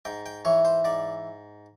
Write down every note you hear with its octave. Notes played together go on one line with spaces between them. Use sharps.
G#2 G5
G5
E3 C#5
C5
G#2 D5